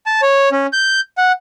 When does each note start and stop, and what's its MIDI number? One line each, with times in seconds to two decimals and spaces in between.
0.06 0.21 81
0.22 0.49 73
0.52 0.67 61
0.73 1.00 91
1.18 1.32 78